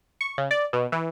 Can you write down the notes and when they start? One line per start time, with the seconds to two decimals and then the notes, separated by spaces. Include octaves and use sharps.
0.21 C#6
0.38 C#3
0.51 D5
0.73 B2
0.92 E3